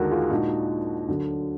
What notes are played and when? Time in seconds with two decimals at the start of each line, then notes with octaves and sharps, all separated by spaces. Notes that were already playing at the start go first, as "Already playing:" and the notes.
Already playing: D#2 D3 G#3 D4 F#4 A#4
0.11 F4 G#4
0.30 A#2 G#3 D4 D#4 F#4
1.08 D2 D3 F#3